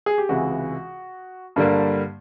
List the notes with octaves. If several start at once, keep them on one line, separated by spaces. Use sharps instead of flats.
G#4
G4
C#2 C3 E3 G#3 F#4
G2 D3 G3 A#3